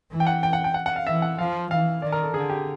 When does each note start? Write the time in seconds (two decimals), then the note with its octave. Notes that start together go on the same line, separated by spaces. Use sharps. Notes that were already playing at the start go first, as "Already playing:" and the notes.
0.11 E3
0.20 G5
0.27 F#5
0.43 G5
0.53 F#5
0.64 G5
0.74 F#5
0.86 F#5
0.96 F5
1.07 E3 E5
1.22 F#5
1.38 F3 F5
1.70 E3 F5
2.02 D#3 D5
2.12 A#4
2.23 A4
2.34 D3 G#4
2.50 G4